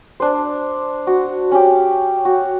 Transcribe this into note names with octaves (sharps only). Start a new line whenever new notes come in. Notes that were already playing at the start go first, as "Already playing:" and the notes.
D4 C5
F#4
C#4 G4
F#4